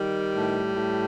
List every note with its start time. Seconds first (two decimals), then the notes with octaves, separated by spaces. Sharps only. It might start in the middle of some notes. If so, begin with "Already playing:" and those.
Already playing: D#3 G3
0.35 A2
0.75 A2